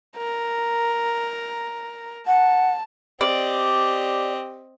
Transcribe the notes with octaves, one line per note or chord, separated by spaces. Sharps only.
A#4
F#5 A5
C4 G4 D5 D#5